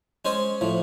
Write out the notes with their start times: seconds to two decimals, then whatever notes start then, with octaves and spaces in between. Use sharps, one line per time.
0.25 G#3 C#4 C5 D#5
0.61 A2 F3